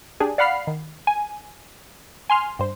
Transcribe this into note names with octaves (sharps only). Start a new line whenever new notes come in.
D4 G4 G#4
D5 F5 F#5 B5 F6 C7
D#3
G#5
G#5 C6 F6
G2 C5